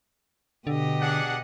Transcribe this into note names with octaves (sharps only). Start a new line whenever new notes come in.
B2 D3 G4 D#5
D4 G#4 F#5